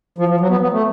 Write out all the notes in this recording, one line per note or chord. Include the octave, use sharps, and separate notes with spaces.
F3
F3
F#3
B3
B3
A3